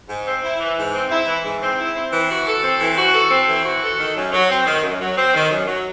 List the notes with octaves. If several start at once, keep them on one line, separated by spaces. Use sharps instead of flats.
G#2
C4
E4
E3
G#2
C4
E4
E3
G#2
C4
E4
C4
E3
F#4
A4
C4
E3
F#4
A4
C4
E3
F#4
A4
D#3
F#2
F#3
C4
D#3
F#2
F#3
C4
D#3
F#2
F#3